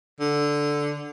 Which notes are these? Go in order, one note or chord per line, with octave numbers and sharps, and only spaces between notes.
D3